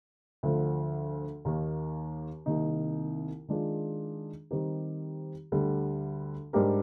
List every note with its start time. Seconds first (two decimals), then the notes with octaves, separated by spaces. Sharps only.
0.43 D2 D3 F3
1.45 D#2 D#3 A#3
2.46 C2 C3 D#3 A#3 D#4
3.48 D#3 G#3 D4 F4 G#4
4.51 D#3 G3 C4 D#4 G4
5.52 D2 D3 G3
6.53 G#2 G3 D4 G4 A#4